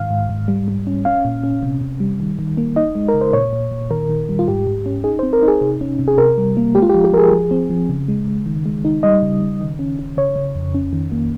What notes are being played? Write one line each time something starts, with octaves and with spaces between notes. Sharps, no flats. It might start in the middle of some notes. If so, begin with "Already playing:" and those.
Already playing: G#2 D#3 F5
G#2
G#2
G3
G3
C#4
C#4 F5
A#2
C#4
C3
C3
G3
D#3
D#3
A#3
D#4 D#5
G#3
A#4
C#3
C5
A#2 C#5
A#2
A#2
D#3 A#4
D#3
G3
F4
G#2 G4
G#2
C#4
D#4 G#4
C5
C4
A#4
D#4
G#4
C3
C#4
C3
G#4
C3 A#4
G3
A#3
G#3 G4
F4
G4
F3
G4
F3 G#4 A#4
F3
C4
F3
C#3
G#3
C#3
D#3
G#3
D#4
G3 D#5
C#3
C#3
D#3
C#4
C#4
C#3 C#5
C#3
F2
C#4
D#3
A#3